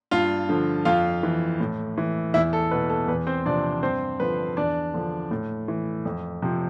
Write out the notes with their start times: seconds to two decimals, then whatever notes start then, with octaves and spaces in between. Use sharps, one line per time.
0.11 G2 F4 F5
0.49 D3 F3
0.85 F2 F4 F5
1.23 E3
1.60 A2
1.98 E3
2.34 E2 E4 E5
2.53 A4
2.71 B2 B4
2.90 A4
3.08 E2 B4
3.27 C4 C5
3.46 C3 F3 D4 D5
3.83 G2 C4 C5
4.20 D3 F3 B4
4.57 E2 D4 D5
4.94 D3 F3
5.31 A2
5.68 E3
6.05 F2
6.42 C3 F3